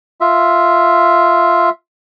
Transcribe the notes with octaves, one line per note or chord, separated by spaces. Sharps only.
F4 E5